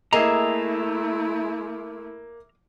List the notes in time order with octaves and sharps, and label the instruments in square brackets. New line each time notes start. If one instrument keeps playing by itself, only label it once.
[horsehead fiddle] A3 E4 [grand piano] A#3 C7 [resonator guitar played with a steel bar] G#4 D#5 [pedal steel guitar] E5 A#5